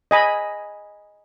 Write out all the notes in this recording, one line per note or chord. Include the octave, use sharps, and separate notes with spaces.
D#5 G#5 B5